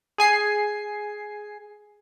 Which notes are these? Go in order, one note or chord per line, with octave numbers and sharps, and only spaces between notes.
G#4 G#5 C7